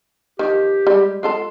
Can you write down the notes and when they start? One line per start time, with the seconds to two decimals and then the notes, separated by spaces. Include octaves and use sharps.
0.39 D#3 F3 G4
0.87 G3 G#3
1.23 G#3 F4 A4 C6